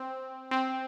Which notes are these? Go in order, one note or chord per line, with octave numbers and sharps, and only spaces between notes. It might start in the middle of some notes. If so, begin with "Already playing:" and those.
Already playing: C4
C4